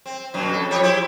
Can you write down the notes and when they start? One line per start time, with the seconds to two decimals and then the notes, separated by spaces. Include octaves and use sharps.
0.06 C4
0.34 F#2 B2 F#3
0.52 F2 A4
0.71 F3 G4 C#5
0.84 E4 G4 C5